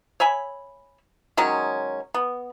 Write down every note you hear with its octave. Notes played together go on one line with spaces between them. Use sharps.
C#5 E5 G#5 B5
D#3 F#3 G#3 C#4
B3